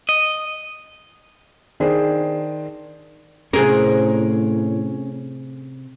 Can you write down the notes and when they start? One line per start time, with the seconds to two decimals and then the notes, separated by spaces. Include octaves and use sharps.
0.09 D#5
1.80 D#3 D4 G#4 C5
3.53 A2 C3 C#4 G#4 A#4